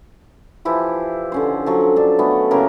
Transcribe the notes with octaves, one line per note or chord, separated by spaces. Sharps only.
E3 F3 E4 G4
D3 C#4 C5
F3 F#3 C#6
D4 A5
A3 B3 C#4
C#3 A#3 E4 A#4